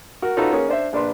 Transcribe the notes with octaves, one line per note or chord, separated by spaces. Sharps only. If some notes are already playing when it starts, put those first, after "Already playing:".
F#4 A#4
C#4 D#4 F4 F#4 A4 B4
A#3 C#4 G#4
D4 C5 E5
A#1 D4 B4 C6